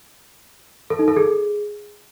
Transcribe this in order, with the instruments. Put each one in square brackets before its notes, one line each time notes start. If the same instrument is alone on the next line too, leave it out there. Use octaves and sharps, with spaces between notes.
[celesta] A4
D#4
A4
G#4